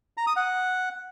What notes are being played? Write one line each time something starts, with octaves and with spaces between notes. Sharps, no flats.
A#5
D#6
F#5